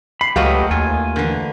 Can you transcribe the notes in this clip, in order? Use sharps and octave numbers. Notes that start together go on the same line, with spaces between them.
B5 C7
C#2 F#3 A3 A#3 G4 B4 D#5 F5
D#2 F4 G#5
D3 E3 A#4